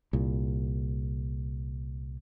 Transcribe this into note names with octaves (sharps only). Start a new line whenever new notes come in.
C2 A#2